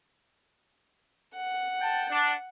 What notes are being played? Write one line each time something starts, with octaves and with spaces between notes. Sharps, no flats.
F#5
G5 A5
D4